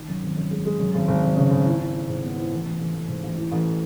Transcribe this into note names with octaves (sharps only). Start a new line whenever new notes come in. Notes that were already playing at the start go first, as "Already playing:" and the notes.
Already playing: D#3
F#2
G#1
F#2
G#3
G#3
F#2
G#1
G#1
G#1
C#3
G#1
E4
E4
E4
G#2
B3
E4
A1
A1
A1
A1
G#2
A1
E3
A1